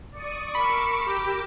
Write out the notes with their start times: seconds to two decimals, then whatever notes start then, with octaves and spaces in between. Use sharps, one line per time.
0.12 D5 C#6 D#6
0.55 A#4 B5 C#6 D6 E6
1.09 G4